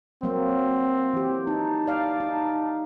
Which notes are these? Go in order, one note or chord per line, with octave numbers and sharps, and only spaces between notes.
F#3 A#3 C4
E3 G4
D#4 A5
D5 F5
D#4